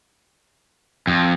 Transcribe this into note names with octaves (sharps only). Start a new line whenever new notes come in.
F2